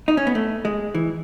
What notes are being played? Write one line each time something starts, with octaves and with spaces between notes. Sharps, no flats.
D#4
C#4
B3
A3
G#3
E3